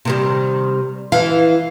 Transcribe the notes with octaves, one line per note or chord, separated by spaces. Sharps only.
C3 D#3 G3
E3 F5